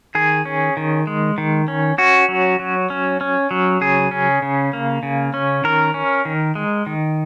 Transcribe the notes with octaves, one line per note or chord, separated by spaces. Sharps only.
D#3 G#4
C#4
D#3
G#3
D#3
C#4
C#4 F#4
F#3
F#3
C#4
C#4
F#3
C#3 G#4
C#4
C#3
A#3
C#3
C#4
D#3 A#4
C#4
D#3
G#3
D#3